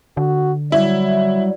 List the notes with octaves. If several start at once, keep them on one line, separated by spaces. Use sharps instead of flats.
D3 F#4
F#3 G3 E4